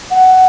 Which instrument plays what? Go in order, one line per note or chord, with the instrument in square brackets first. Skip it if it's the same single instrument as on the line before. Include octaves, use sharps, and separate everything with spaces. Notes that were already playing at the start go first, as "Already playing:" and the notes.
[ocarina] F#5